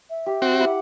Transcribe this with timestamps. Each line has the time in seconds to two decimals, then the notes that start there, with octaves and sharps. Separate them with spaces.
0.10 E5
0.26 G4
0.42 C4 F#4
0.60 E4 F#5 D6